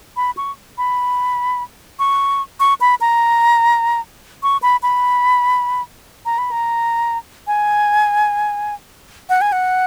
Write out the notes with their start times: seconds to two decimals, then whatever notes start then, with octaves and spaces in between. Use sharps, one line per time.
0.17 B5
0.37 C#6
0.78 B5
1.99 C#6
2.60 C#6
2.81 B5
3.01 A#5
4.43 C#6
4.62 B5
4.83 B5
6.26 A#5
6.38 B5
6.51 A#5
7.47 G#5
9.29 F#5
9.41 G#5
9.52 F#5